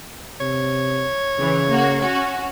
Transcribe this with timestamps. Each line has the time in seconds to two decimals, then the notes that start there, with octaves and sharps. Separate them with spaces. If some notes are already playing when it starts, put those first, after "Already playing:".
0.41 C3 C#5
1.38 C#3 E3
1.70 A#3 F#4
2.01 C#4 F#4